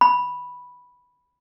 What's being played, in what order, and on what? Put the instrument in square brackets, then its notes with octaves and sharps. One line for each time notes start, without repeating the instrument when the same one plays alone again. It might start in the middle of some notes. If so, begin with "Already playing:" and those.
[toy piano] B5